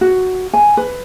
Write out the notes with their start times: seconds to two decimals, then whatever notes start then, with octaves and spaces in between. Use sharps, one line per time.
0.01 F#4
0.53 G#5
0.77 B4